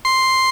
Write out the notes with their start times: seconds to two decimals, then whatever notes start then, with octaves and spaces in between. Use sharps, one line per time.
0.05 C6